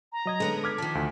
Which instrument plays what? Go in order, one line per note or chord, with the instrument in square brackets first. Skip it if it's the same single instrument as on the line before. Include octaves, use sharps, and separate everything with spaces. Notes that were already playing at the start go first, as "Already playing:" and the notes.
[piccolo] A#5
[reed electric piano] F#3 D#5 G#6
[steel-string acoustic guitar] D3 B3 C#4 [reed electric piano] G#3
[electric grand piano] D6 F6 G#6 [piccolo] B6
[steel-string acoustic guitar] D#3 F3 [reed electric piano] A5
[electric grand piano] D2